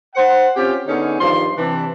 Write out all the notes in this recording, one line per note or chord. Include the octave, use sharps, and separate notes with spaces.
C5 F#5
C4 C#4 F4 G4
D3 B3 C#4 D#4 G#4
G2 D#3 F3 C6
C3 E3 D4